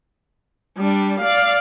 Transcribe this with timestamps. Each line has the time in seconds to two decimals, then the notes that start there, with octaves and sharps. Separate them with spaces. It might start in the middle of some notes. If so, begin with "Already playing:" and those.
0.77 G3 D4
1.20 D5 F5